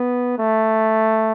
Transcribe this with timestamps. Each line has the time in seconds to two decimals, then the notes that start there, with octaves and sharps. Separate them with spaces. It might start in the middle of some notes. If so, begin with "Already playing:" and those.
Already playing: B3
0.39 A3